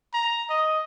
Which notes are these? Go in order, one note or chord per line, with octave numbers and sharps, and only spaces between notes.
A#5
D#5